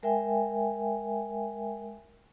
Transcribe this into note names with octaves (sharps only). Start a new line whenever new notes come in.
G#3 A#4 E5 G5 G#5